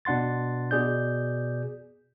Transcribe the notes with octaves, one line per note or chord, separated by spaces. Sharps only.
B2 D4 F#5 C6 A6
B2 G#4 D5 G6